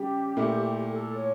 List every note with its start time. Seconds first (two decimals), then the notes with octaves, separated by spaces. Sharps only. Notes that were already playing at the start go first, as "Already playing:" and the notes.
Already playing: C#3 G3 G4
0.37 A#2 A3 E4
0.90 A4
1.17 C#5